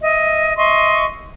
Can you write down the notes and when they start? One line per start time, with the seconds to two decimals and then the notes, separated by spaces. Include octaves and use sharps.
0.02 D#5 E5
0.57 D#5 E5 C6 C#6